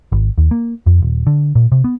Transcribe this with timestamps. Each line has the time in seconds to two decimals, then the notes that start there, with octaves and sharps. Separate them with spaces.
0.12 G#1
0.38 D#2
0.51 A#3
0.86 F2
1.02 D#1
1.27 D3
1.55 A#2
1.72 C3
1.84 B3